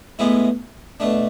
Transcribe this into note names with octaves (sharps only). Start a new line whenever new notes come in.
A2 G#3 B3 E4
B2 A3 D4